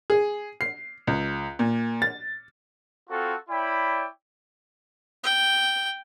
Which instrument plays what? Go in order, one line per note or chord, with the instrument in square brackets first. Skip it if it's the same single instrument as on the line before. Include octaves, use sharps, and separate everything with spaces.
[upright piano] G#4
C7
C#2
A#2
A6
[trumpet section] C4 F4 F#4 A4
E4 C#5 D5 G5 B5
[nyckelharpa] G5